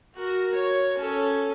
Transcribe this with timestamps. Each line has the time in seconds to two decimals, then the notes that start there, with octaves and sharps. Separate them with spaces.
0.16 F#4 A#4
0.54 C#5
0.97 C#4 A4